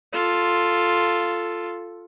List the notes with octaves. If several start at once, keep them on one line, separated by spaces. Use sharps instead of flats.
F4 A4